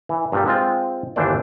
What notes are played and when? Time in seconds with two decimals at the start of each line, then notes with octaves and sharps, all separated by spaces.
0.09 E3
0.32 G2 A#2 G3
0.46 G#3 C4 F4
1.16 G1 D#2 E3 D4 C5 D5